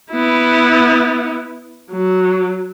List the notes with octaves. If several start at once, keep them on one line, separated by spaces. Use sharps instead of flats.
B3 E4
F#3